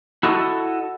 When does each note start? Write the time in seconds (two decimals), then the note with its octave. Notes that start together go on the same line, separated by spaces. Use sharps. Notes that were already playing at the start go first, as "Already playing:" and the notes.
0.23 E4 F#4 A4 D#5